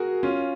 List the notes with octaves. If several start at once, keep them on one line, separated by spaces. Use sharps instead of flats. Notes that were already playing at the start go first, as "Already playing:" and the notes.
Already playing: F#4 G#4 A#4
C#4 F4